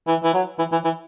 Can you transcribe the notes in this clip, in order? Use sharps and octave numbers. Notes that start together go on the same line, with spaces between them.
E3
E3
F#3
E3
E3
E3